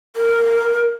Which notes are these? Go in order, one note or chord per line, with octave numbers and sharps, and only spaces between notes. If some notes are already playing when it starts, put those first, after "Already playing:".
A#4